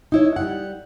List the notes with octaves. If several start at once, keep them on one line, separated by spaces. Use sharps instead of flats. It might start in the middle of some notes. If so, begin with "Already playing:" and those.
D#4 E4 C#5
G3 F#5